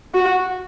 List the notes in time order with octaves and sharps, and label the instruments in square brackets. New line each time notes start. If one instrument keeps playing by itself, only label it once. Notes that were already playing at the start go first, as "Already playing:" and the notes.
[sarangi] F#4